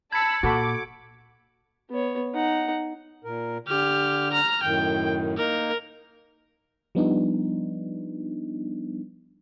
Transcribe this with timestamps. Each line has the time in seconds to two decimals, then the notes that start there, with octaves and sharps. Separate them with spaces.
0.12 A5 B5 E6 G#6 C#7
0.43 A#2 F#4 A4 B5 D6
1.90 B3 C#5
2.34 D#4 F#5
3.24 A#2 A#4
3.68 D3 G4 F6
4.32 A#5 F6
4.63 F#2 A2 D#3 G5
5.38 A#3 D#4 A#4
6.95 F3 G3 B3 D4 D#4